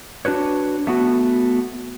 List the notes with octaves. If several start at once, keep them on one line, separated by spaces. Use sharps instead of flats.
D4 F#4 B4 C#5
A3 B3 F#4